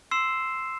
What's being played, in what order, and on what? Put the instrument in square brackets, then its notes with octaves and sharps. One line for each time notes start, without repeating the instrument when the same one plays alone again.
[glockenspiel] C6 E6 C7 E7